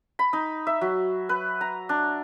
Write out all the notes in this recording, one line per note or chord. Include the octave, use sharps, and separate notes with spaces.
B5
D#4
E5
F#3
B4
A#5
D4